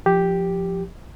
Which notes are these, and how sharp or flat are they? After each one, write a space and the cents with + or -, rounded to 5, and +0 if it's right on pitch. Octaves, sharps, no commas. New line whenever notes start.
F3 +0 G4 +0